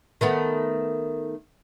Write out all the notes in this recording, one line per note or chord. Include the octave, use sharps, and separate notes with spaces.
D#3 A3 B3